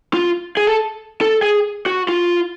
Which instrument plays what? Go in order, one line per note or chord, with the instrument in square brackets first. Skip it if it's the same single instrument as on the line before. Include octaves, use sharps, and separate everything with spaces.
[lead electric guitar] F4
G#4
A4
A4
G#4
F#4
F4